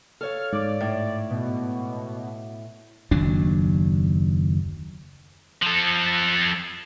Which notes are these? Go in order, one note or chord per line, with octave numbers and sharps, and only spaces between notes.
A4 C#5 F5 F6
G#2 D5 D6
A2
B2
F#1 D#2 F#3 D4
F3 A4